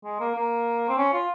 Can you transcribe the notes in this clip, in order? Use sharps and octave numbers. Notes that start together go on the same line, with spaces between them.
G#3
A#3
A#3
C4
C#4
F4